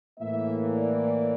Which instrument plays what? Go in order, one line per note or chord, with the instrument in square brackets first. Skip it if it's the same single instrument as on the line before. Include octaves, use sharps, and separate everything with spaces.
[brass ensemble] A2 E3 A#3 E5
D5